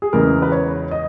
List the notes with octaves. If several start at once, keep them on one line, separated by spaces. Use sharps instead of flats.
G#4
E2 C#3 G#3 A#4
B4
C#5
D#5